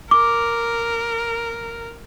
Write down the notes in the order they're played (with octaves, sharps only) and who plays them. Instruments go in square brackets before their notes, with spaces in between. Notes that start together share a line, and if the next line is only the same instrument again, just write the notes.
[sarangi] A#4 [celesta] D6